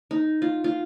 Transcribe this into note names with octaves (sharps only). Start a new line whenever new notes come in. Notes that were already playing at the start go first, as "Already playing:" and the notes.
D#4
F4
F4